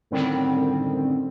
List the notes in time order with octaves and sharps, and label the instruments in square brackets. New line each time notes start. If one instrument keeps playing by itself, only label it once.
[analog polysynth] F#2 A2 D3 D#3 G3 C4